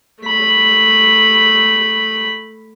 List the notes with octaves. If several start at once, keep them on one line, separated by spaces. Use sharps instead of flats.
A3 B5